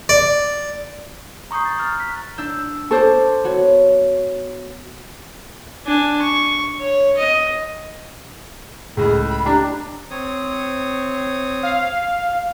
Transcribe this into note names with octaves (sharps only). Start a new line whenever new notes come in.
D5
A#5 C#6 D#6 G6 C7
A6
A#5 F6 A6
F#6 B6
D4 E6 G6
A4 C5 C#6 D6
B3 F#4 C#5
D4 G#5
C#6
C#5
D#5
C#2 A2 G#4
B5
D4 G4 A#5
C4 C#5 D#6
F5